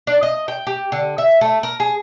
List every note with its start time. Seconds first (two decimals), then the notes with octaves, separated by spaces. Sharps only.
0.07 D4
0.23 D#5
0.48 G5
0.67 G4
0.92 D3
1.18 E5
1.41 A3
1.63 A#4
1.80 G#4